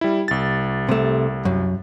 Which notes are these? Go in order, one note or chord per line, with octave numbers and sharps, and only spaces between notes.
G3 E4
C2 A6
C3 A3
F#2